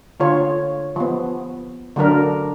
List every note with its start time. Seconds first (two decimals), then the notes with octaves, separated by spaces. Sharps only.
0.20 D3 F4 C#5
0.96 F3 B3
1.96 D3 F#3 D4 A#4